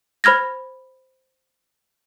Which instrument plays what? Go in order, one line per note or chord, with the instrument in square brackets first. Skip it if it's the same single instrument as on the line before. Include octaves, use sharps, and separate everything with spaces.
[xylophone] C5 B5 F6 G#6 A#6